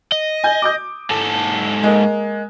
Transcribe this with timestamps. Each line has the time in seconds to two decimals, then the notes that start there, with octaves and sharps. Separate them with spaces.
0.12 D#5
0.44 G#5 G6
0.62 D6 D#6 G6
1.10 G#2 A4
1.83 G#3 A#3